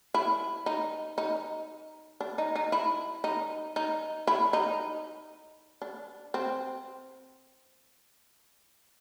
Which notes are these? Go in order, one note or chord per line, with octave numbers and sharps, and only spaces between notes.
E4
D#4
D#4
D4
D#4
D#4
E4
D#4
D#4
E4
D#4
D4
C4